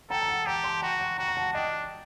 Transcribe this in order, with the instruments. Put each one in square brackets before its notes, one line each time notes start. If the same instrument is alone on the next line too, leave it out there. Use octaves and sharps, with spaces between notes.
[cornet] A4 [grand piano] G5 A#5
[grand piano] A#5
F#5 A5
[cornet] G4 [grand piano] G5 A#5
[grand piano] A5 C6
[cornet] F#4 [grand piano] G5 A#5
[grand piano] G5 A#5
[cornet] F#4 [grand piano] G5 A#5
[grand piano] A#5
F#5 A5
[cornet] D4 [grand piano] D#5 G5